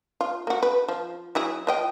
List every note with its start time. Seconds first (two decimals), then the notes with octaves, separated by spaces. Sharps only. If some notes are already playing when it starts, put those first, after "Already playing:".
0.21 F4
0.47 A#3 F#4
0.63 B4
0.88 F3
1.35 F#3 E4 G#4
1.67 F3 D#5 G5